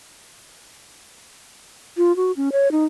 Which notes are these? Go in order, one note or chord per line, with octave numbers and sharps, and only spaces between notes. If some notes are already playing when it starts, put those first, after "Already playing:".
F4
F#4
C#4
C#5
D#4